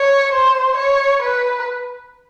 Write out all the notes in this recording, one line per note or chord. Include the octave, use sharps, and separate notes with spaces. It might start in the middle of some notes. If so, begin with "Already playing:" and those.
Already playing: C#5
C5
C#5
B4